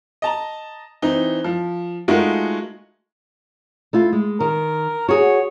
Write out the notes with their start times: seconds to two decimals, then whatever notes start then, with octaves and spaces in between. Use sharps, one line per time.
0.22 D#5 A5 A#5
1.02 E3 C4 D#4
1.44 F3
2.08 G#3 A3 D#4 F4 F#4 A#4
3.93 A3 E4 F4
4.13 G#3
4.40 D#3 A#4
5.09 F#4 G#4 C#5